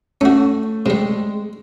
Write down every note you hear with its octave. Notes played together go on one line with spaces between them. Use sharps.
A3 C#4 F#4
C3 G3 G#3